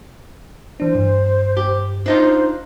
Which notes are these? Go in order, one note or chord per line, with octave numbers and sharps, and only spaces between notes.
E3 D4 C5
G2
G4
D4 D#4 F4 C5